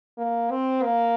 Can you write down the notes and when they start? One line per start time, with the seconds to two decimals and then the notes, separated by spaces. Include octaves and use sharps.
0.18 A#3
0.51 C4
0.83 A#3